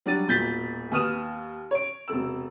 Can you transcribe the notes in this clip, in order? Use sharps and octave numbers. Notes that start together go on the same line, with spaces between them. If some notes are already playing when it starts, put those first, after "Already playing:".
F#3 G3 D4 F#4 A6 D#7
E1 A#2 G6 A6 B6
D#2 B4 D#6 F6 D#7 E7
C#5 D7
E1 C3 A3 E6